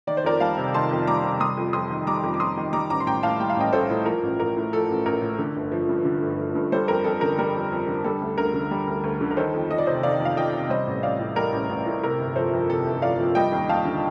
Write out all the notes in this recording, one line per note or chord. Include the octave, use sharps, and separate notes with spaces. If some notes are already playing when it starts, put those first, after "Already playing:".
D#3 D5
C5
F2 A#4 D5
G3 F5 A5
C3
D#3 A5 C6
F2
G3 A#5 D6
C3
G3 C6 D#6
F2
F2 C6 D#6
D#3
G3 A#5 D6
F2
D6
F2 C6 D#6
D#3
G3 A#5 D6
A1 A#5 D6
C6
A1 G5 A#5
A2 F5 A5
G3 G5
F5
A1 D#5 G5
A1 A4 C5
A2
F3 A#4
A1
A1 A#4
A2
F3 A4
A1
A1 A#4
A2
D3
G1
F3
G2
D3
G1
F3
G2
G3 A4 C5
F2 A#4
F2 A4
D3 A#4
G3 A#4
F2
F2
D3
G3 A4
D2
D2 A#4
D3
G3
D2
D2
D3
A#4
D#3 A4 C5
F2
F2 D#5
D5
C3 C5 D#5
D#3 D5 F5
F2
F5
F2 D#5 G5
C3
G3 C5 D#5
A1
A1 D5 F5
A2
G3 A#4
A1
A1
A2
C3 A#4
G1
F3 A4 C5
F2
C3 A4
G1
F3 D5 F5
F2
G3 D#5 G5
D#2
D#2 F5 A5
D3